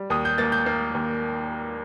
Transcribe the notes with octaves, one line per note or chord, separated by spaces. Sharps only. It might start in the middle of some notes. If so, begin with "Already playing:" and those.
Already playing: G3
D#2 D#6
G6
A#3 A6
G6
A#3
D#2